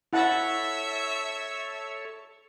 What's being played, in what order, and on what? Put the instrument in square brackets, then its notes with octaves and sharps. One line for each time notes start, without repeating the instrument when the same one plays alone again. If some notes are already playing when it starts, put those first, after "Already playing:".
[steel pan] E4 F#5 A5 [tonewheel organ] A4 C#5 [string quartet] E5